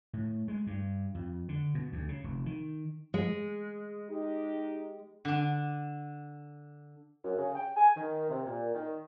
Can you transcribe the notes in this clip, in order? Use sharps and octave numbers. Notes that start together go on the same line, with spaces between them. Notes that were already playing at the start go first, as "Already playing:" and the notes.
A2
G#3
G2
F2
D3
B2
D2
C#3
F1
D#3
G#3
D#4 G4
D3 D4
F#2
C#3
G5
G#5
D#3
C3
A#2
D#3